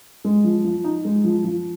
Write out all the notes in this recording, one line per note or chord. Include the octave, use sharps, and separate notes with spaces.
G#3
F3
F3
D#4
G#3
F3
F3